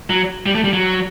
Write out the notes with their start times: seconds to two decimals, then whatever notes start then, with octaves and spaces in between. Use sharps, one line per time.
0.10 F#3
0.46 G3
0.55 A3
0.64 G3
0.73 F#3